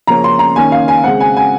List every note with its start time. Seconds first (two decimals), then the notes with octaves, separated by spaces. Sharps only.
0.07 C#3 F3 A#3 C#4 A#5
0.24 C6
0.39 A#5
0.56 D#3 A#3 C#4 G#5
0.72 F5
0.88 G#5
1.04 C#3 G#3 C4 F#5
1.20 G#5
1.37 G#5